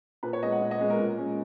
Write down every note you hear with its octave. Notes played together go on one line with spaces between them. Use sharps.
A#2 B4
C#5
G#3 B3 D#5
F#5
A#2
D#5
G#3 B3
A#4
A#2
G#3 C#4